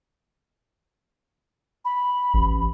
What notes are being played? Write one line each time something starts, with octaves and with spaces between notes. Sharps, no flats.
B5
A1